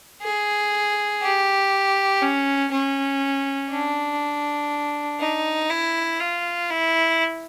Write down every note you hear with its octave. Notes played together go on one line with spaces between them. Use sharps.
G#4
G4
C#4
C#4
D4
D#4
E4
F4
E4